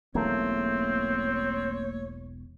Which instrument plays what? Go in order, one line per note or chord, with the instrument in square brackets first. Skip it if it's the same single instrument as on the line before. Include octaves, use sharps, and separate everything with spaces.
[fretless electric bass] E1 B1 E2 [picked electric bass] A3 A#3 [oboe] C4 [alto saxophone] C#5